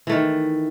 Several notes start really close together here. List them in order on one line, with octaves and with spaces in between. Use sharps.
E3 A3 D#3